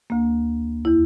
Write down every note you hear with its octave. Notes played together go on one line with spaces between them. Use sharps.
D2 A#3
E2 E4